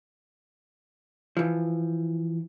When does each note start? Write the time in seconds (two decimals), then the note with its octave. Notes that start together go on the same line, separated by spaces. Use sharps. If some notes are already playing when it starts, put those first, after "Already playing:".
1.37 E3 F3